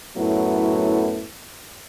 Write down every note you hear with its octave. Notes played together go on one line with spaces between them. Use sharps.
F#2 A2 F#3 A3 B3 E4